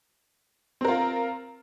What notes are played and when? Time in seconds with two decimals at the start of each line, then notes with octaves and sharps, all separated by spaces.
0.81 C4
0.85 A#4
0.88 F4